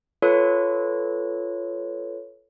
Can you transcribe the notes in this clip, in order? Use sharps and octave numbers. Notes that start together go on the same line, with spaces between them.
F4 A4 B4 C#5